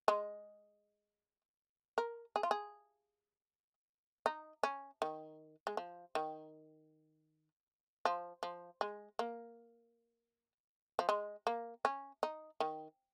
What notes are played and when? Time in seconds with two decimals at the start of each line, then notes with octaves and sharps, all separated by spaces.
0.08 G#3
1.98 A#4
2.36 G#4
2.43 F4
2.51 G#4
4.26 D#4
4.63 C#4
5.02 D#3
5.67 G#3
5.77 F3
6.15 D#3
8.05 F3
8.43 F3
8.81 G#3
9.19 A#3
10.99 F3
11.09 G#3
11.47 A#3
11.85 C#4
12.23 D#4
12.60 D#3